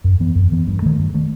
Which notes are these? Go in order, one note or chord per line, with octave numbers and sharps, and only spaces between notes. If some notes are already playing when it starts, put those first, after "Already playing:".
F#2
E3 B3
F#2
E3 B3
G2
D#3 A3
G2
D#3 A3